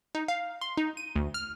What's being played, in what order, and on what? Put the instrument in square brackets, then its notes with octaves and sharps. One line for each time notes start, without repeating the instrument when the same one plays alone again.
[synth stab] D#4
F5
C6
D#4
D#7
D2
F6